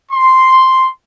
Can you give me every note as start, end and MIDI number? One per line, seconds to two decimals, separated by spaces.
0.12 0.88 84